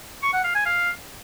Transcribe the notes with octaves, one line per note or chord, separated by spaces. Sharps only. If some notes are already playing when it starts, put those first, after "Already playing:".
C#6
F#5
F5
G#5
F5